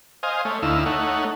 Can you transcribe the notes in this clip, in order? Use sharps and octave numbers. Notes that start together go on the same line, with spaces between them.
C5 D#5 F5 G#5
A3 C#5
D2 D#4 E4 F5 E6
A3 D#4 C#5 F#5